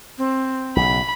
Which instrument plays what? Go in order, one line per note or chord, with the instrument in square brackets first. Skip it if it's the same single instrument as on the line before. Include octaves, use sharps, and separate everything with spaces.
[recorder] C4
[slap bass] B1 C#3 [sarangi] B5